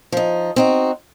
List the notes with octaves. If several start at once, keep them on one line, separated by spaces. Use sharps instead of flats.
F3 D#4
C4 D#4 F#4